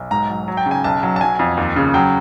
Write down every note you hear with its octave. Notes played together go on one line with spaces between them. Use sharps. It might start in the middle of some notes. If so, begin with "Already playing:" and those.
Already playing: B1
G#2 A#5
F#3
F#3
G5
C#3
G#5
B1 A5
F#3
A5
F#3 G#5
F2
D#2
C#3
F#3 G5